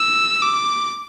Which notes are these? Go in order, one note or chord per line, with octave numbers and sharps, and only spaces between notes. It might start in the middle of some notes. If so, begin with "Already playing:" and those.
Already playing: E6
D6